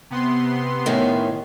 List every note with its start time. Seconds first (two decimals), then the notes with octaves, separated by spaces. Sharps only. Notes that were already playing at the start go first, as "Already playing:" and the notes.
0.10 C3 B3 C6
0.86 A2 D#3 C#4